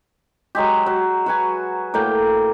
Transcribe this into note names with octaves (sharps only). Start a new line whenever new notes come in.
F#3 G#3 G4
F#3
F#4 B4 G#5
A2 A#3 G5